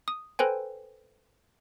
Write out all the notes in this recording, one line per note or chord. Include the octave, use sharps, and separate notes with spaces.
D#6
A4 B4 C5 G5 G#5